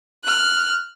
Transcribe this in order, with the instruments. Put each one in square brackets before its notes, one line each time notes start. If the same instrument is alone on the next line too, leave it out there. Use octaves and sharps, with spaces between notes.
[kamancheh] F6 F#6